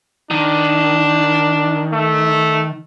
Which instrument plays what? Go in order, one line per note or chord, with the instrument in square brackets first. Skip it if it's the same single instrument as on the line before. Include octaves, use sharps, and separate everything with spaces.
[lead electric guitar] D#3 [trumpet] D4
[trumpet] A3